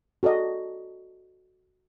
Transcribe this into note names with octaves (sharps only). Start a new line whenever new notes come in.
F#4 A4 D5 D#5